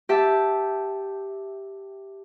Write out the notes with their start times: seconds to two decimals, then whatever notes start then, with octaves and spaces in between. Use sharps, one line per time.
0.09 G4 E5 A5